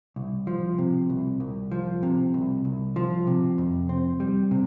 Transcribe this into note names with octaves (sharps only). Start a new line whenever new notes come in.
C2
F3
C3
C2
C2
F3
C3
C2
C2
F3
C3
F2
C4
G3
C3